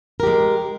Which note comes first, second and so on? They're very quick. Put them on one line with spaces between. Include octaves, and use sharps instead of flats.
A#4 G4 G#3